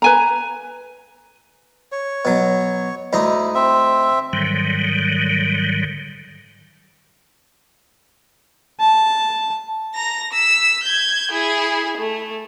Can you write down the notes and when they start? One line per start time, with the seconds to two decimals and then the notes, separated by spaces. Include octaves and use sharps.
0.02 B4 G#5 A#5
1.92 C#5
2.25 B2 F#3
3.13 D2 D#4 E4 D#5
3.55 C4 E5
4.33 G#2 D3 D#3 F#3 G3
8.80 A5
9.95 A#5 A#6
10.32 E6 B6
10.84 G6 G#6
11.31 E4 G#4
11.98 A3